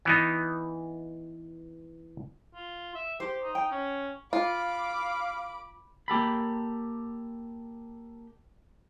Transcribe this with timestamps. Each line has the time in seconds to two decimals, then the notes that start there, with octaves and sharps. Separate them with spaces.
0.05 E3 B3 D#4
2.55 F4
2.95 E5
3.20 G4 C5
3.42 D#4
3.55 G5
3.71 C#4
4.33 F4 F5 B5 D6
6.08 A#3 G4 A4 B5